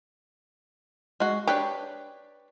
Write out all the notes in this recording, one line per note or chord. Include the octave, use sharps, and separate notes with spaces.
G#3 F#4
D4 G4 B4 C#5